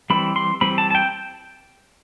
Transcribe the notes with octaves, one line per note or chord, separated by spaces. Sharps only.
E3 G3 C4 B5
C6
E3 G3 C4 B5
A5
A5
G5